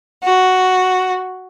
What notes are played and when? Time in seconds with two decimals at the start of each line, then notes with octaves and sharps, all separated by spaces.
0.22 F#4